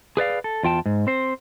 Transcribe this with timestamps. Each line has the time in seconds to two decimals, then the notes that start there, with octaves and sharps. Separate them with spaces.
0.17 G#4 B4 D5 F5
0.44 A4
0.63 E2 F4 G5 A5
0.86 G#2
1.07 C4 C5